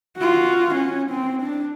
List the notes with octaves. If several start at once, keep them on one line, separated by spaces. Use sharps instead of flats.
F4 F#4
C#4
C4
D4